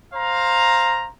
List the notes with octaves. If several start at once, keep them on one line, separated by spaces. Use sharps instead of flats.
C5 F5 A#5